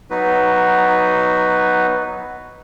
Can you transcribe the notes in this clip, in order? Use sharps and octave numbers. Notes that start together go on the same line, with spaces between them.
F#3 B3 D#4 F#4 B4